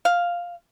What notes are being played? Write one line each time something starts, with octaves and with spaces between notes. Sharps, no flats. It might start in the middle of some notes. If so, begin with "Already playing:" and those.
F5